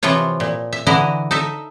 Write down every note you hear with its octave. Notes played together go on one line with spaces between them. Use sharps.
C3 E3 F3 F4 C#5
A#2
E5
D3 E3 E4 D#5 G#5 A#5
D#4 A4 E5